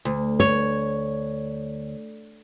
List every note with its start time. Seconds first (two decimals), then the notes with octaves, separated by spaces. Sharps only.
0.05 D2
0.40 C#5